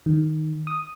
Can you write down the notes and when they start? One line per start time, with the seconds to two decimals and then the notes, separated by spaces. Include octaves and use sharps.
0.06 D#3
0.67 D#6